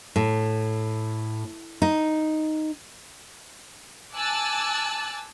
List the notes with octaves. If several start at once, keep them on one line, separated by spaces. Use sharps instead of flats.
A2
D#4
G#5 A5 D6 E6 F#6 A6